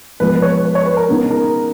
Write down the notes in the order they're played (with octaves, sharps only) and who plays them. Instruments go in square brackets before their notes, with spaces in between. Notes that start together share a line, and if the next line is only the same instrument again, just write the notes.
[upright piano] G#2 F3 G#3 B3 [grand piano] B4
[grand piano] B4
C#5
B4
C#5
B4
A#4
[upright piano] C#3 G#3 B3 D#4
[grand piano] A#4